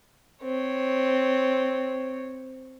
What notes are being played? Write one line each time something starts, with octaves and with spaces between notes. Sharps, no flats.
C4 C#5